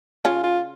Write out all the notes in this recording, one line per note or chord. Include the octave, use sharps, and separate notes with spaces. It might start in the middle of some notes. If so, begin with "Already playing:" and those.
C#3 C#4 F4
F4